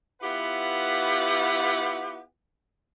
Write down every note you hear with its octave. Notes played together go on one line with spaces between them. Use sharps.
B3 E4 F4 G4 B4 F#5